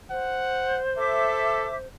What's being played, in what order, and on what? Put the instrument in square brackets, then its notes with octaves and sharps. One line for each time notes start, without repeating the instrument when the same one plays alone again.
[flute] C5 [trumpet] F#5
[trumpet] A4 [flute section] E5 D6